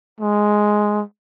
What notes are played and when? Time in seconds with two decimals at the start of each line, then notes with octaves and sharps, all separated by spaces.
0.20 G#3